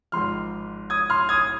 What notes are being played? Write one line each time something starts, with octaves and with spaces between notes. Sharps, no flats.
G#1 G#2 F3 C6 F6
D#6 G#6
C6 F6
D#6 G#6